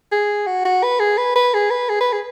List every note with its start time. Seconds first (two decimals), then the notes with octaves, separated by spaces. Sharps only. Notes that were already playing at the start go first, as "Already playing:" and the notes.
0.12 G#4
0.46 F#4
0.65 F#4
0.83 B4
1.00 G#4
1.17 B4
1.35 B4
1.54 G#4
1.70 B4
1.89 G#4
2.01 B4
2.12 G#4